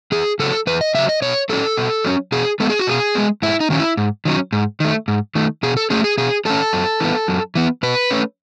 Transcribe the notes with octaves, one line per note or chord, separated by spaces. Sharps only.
E2 G#4
C#3 F#3 A4
E2 B4
D#5
C#3 F#3 E5
D#5
B2 C#5
F#3 C#4 A4
B2
F#3 C#4
B2 G#4
G#3 B3 A4
G#4
F#4
B2 G#4
G#3 B3
G#2 E4
D#4
D#3 F#3 C#4
E4
G#2
D#3 F#3 C#4
G#2
D#3 A3
G#2
D#3 A3
B2 G#4
A4
F#3 A3 C#4 G#4
G#4
B2 G#4
F#3 A3 C#4 A4
F#2
E3 B3
F#2
E3 B3
B2 B4
A3 C#4